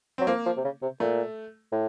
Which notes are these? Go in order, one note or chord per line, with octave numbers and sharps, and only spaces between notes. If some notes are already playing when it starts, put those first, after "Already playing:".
F#3 C4
F3 A#3
F3
C3
C#3
C3
A#2 A3
A2